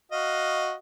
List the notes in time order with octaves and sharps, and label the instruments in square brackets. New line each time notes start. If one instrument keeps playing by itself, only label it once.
[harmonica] F#4 D#5 F5